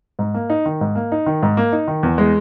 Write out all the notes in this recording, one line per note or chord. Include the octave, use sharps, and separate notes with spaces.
G#2
A#3
D#4
D#3
G#2
A#3
D#4
D#3
G#2
A#3
D#4
D#3
E2
G#3